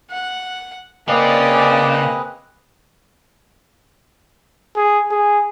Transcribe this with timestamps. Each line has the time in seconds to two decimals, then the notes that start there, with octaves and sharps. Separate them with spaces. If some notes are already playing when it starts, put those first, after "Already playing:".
0.11 F#5
1.08 C#3 A#3 C4 G#4 B4 D5 D#5
4.76 G#4
5.11 G#4